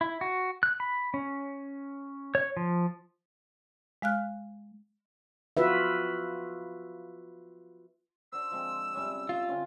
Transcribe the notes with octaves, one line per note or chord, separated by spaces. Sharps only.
E4
F#4
F#6
B5
C#4
C#5
F3
G#3 F5 F6 F#6
F4 F#4 B4 E5
D4 F#4 C5 E6
F3 G#3 C4
C3 G3 C#4
F4
D3 C4 C#4